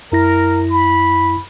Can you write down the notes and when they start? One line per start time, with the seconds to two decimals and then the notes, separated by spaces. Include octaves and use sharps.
0.12 F#2 E4 A#4 A#6
0.71 B5